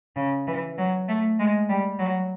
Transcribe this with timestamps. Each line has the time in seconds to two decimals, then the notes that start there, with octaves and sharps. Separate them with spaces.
0.16 C#3
0.47 E3
0.78 F#3
1.08 A3
1.39 G#3
1.69 G3
1.99 F#3